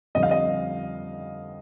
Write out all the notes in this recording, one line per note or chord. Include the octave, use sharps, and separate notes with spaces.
F2 D3 G3 D#5
F5
D#5